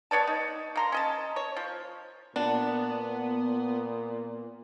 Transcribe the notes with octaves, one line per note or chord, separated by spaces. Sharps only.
B3 C#5 D5 A5
D#4
A#3 A#5 C6
C#4 D#5 A5
C#5
F3
A#2 B3 D4